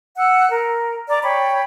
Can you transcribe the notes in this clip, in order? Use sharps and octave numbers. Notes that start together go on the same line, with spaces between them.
F#5 E6 F#6
A#4
D5 A#5 D6
C#5 G5 B5